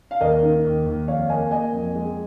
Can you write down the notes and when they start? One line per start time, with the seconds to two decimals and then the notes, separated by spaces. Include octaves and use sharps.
0.11 F5
0.21 D#2 A#4 D#5
0.43 D#3
0.65 D#2
0.86 D#2
1.08 F2 C#5 F5
1.29 A#3 D#5 G#5
1.51 A#3 D#5 G#5
1.73 F2
1.95 G#3